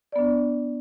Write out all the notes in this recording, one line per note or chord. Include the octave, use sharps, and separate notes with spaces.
B3 D4 D5